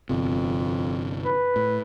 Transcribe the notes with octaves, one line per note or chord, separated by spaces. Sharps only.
G1 F2 C3
B4
A2